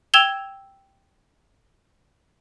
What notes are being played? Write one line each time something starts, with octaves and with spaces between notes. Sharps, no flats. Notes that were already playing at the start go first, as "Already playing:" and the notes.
G5 E6 G#6 E7 F7 G7